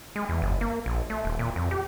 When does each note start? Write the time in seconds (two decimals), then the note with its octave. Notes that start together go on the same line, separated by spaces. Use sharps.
0.16 G#3
0.29 E2
0.42 G1
0.61 A#3
0.86 A#1
1.10 A3
1.25 D#1
1.39 A#2
1.56 F2
1.71 G4